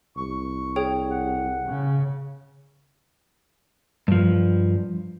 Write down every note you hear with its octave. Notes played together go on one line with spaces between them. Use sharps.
C2 C#6
G#4 C#5 G5
F#5
C#3
G2 F3